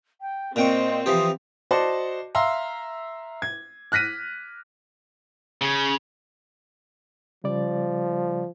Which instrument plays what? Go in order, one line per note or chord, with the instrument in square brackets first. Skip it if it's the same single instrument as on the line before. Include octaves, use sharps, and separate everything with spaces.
[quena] G5
[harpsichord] A#2 G5 C#6 [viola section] C4 [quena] D#5
[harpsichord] E3 F3 G4 [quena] D#6
[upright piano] F#4 C5 D5 D#5 A5
E5 F5 A#5 C6 E6
G#6
F6 F#6 A#6 B6 D#7
[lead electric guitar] C#3
[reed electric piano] C#3 G3 D5 [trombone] F3